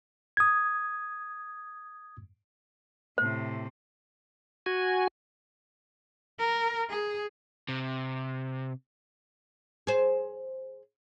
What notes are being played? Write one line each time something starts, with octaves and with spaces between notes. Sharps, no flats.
D#6 G#6
A2 C3 C5
F#4 G#5
A#4
G#4
C3
G#4 C5